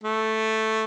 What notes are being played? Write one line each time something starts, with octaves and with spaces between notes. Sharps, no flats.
A3